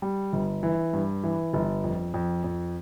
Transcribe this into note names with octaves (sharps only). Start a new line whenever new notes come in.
G3
G1
E3
G2
E3
G1
F2
F2
F2